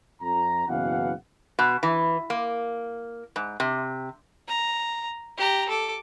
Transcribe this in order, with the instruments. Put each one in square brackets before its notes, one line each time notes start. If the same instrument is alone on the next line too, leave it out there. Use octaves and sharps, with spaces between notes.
[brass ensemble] F2 A#5
F#1 F#2 B2 E3 F5 F#5
[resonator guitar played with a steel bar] B2
E3
A#3
G#2
C3
[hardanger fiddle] A#5
G4 A#5
A4 D6